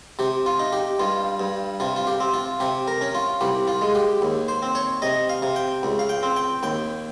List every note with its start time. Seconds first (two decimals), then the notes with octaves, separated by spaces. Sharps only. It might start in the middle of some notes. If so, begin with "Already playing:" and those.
0.19 C3 G4
0.46 F4
0.59 D#4
0.73 G4
1.00 G2 F4
1.40 G2
1.80 C3 F4
1.96 F4
2.07 G4
2.20 C4
2.34 F4
2.60 C3 G4
2.88 A#4
3.01 C#4
3.15 F4
3.41 C2 G4
3.68 F4
3.82 G#3
3.95 G4
4.22 D#2
4.48 C5
4.63 C4
4.75 C#5
5.02 C3 D#5
5.30 F5
5.42 C3
5.56 G5
5.83 C#2
5.99 F5
6.09 G5
6.23 C4
6.36 G5
6.63 D#2 G5